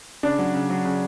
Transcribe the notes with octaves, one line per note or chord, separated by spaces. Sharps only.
C#3 D4
F#3
C#3
F#3
C#3